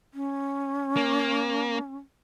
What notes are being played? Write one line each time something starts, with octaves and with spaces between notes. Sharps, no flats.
C#4
A#3